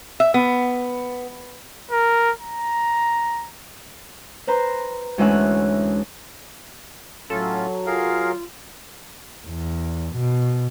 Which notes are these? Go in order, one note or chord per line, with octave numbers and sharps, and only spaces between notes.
E5
B3
A#4
A#5
B4 C5 A#5
D2 E3 G#3 C#4 E5 F#5
A2 F#3 C#4 F4 A4
F4 G#4 A#4 F5
E2
B2